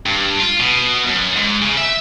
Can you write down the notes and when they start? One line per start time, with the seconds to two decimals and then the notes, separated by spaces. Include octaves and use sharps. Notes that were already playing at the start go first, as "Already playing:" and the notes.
0.06 G2
0.40 F4
0.60 B2
1.06 F#2
1.36 G#2
1.62 C#3
1.77 E5